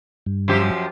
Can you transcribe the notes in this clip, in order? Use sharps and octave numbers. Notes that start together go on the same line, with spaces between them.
G2
F#2 F3 G4